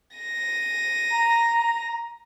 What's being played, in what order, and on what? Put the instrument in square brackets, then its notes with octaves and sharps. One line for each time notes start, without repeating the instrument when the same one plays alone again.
[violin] A#6 D#7
[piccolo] A#5